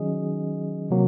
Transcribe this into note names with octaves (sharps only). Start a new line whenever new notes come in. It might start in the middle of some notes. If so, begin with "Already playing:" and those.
Already playing: D#3 F#3 C#4 G#4 D#5
C3 F#3 A#3